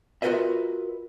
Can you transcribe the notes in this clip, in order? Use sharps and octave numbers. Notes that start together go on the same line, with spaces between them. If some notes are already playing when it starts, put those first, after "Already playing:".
F4 F#4 A#4 B4 D#5 E5